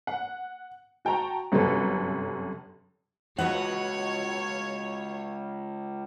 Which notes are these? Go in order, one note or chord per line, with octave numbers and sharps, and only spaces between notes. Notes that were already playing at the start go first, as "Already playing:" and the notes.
F#5
F#4 G5 A5 A#5 C#6
G1 F#2 C3 A4 B4
C#2 F#4 B4 C#5 F#5